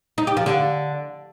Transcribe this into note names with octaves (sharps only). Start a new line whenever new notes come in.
D#4
G4
F3
D3